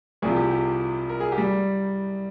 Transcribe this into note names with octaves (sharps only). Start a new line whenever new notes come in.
C2 C3 F3 G#4
G4
G4
A#4
G#4
G4
G3